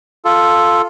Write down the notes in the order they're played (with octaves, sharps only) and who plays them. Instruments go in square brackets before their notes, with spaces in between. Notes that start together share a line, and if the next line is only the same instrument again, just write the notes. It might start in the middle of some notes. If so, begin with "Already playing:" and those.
[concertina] F4 A4